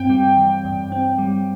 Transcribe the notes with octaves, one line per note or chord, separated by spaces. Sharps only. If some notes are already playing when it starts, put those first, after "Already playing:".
Already playing: G2 C4 G5
G3
E3
G2
C4
G3